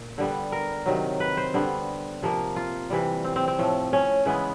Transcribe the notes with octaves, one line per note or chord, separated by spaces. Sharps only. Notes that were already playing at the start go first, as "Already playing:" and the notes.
Already playing: A#2
D3 G3 B3
A#4
C3 D#3 F#3
B4
C5
D3 G3 B3
C3 F3 A#3
F4
C3 E3 G3
C4
C4
C4
A2 F3 A3
C#4
C#3 E3 G#3 B3